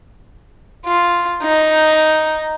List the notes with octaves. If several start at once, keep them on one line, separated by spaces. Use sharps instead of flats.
F4
D#4